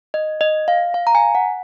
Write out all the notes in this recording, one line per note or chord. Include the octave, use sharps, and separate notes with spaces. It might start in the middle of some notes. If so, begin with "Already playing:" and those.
D#5
D#5
F5
F5
A#5
G#5
F#5